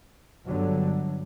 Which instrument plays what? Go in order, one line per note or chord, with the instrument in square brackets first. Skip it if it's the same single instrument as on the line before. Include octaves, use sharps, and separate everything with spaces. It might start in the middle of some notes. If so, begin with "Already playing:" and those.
[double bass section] G1 G2 D3 F#3